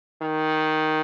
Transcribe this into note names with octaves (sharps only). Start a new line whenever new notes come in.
D#3